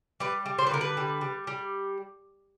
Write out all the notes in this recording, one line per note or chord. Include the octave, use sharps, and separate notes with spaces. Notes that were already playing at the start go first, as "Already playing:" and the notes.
G3 B4
G3
C5
B4
D3 A#4
B4
G3
G3
G3